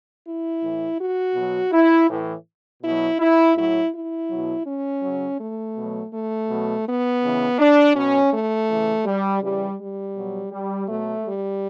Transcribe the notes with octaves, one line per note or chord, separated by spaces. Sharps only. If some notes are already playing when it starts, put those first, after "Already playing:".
E4
A2 E3
F#4
B2 F#3
E4
A2 E3
B2 F#3 E4
E4
A2 F#3 E4
E4
B2 F#3
C#4
C#3 F#3
A3
B2 F#3
A3
B2 F#3
B3
C#3 E3
D4
B2 F#3 C#4
A3
C#3 E3
G3
C#3 E3 G3
G3
B2 F#3
G3
B2 F#3 A3
G3